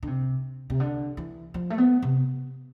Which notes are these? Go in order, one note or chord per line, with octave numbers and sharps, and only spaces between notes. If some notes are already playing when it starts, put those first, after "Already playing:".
D3
C3
C3
D3
E3
F3
A3
B3
C3